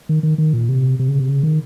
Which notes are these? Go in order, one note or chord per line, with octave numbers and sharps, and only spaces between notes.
D#3
D#3
D#3
A#2
C3
C3
C#3
C3
C#3
D#3